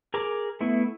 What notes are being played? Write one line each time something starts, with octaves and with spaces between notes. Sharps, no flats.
G#4 A#4 A#5 D6
A3 B3 E4